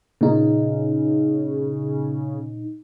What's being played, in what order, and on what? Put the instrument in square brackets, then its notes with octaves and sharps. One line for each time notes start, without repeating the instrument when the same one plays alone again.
[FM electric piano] A#2 D#4 [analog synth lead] C#3